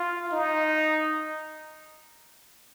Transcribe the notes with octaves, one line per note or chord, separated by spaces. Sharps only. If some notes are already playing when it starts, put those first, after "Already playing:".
Already playing: F4
D#4